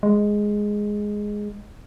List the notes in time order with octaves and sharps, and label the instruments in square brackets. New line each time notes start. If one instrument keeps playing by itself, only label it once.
[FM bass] G#3